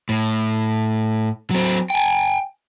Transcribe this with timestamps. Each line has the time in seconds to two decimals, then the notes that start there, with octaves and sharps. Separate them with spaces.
0.09 A2
1.51 F#3 C4
1.90 G5 G#5